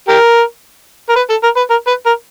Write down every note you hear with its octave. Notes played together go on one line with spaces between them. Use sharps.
G4 A#4
A#4
B4
A4
A#4
B4
A#4
B4
A#4